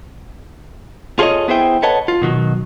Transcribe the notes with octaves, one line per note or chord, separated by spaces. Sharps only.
F4 G#4 A4 B4 C#5 D#5
B3 E4 G#4 C5 E5 G5
A4 B4 C#5 D#5 F#5 A5
F4
B2 D#3 F#3